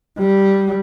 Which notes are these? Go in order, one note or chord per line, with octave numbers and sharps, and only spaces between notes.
G3